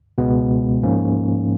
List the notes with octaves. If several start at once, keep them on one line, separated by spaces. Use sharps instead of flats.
C#2 B2 G#3 B3
G#2 F3 A#3 C#4